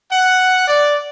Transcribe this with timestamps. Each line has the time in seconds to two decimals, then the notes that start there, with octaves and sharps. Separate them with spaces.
0.11 F#5
0.67 D5